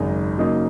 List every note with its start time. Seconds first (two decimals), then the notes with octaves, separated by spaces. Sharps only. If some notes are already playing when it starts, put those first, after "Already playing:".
Already playing: G#1 F#2 C#3 G#3 D#4
0.38 C#3 F#3 A#3 D#4